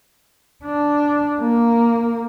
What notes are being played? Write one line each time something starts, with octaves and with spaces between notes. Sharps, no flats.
D4
A#3